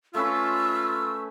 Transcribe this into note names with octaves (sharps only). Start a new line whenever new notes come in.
A3 C#4 F4 B4 E6